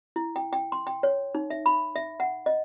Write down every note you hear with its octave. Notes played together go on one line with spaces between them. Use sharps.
E4
G5
G5
C6
G5
C#5
D#4
E5
B5
E5
F#5
D#5